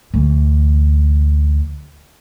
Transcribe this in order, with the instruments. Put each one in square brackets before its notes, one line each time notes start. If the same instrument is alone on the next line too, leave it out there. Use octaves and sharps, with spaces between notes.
[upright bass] D2 E3